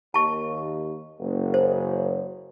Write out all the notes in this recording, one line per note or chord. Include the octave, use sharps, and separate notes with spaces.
D#2 A5 C#6
F#1
C5